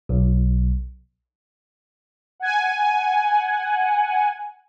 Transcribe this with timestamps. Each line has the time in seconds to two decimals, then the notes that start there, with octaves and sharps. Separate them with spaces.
0.09 B1
2.40 F#5 G#5